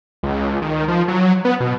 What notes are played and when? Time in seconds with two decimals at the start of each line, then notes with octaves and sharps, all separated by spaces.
0.23 C#2
0.62 D#3
0.88 F3
1.08 F#3
1.45 B3
1.60 B2